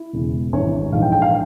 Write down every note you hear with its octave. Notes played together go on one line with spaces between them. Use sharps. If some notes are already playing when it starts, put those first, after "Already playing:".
Already playing: E4
E1 E2 C#3 E3
G#1 G2 E3 C#5
A#1 G#2 E3 F5
G5
G5
F5